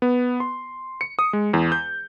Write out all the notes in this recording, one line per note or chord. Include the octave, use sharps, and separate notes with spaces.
B3
C6
C#7
D#6
G#3
E2
G6